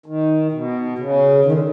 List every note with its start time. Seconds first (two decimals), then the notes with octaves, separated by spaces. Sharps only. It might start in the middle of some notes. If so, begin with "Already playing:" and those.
0.06 D#3
0.52 B2
0.99 C#3
1.45 D#3
1.52 D3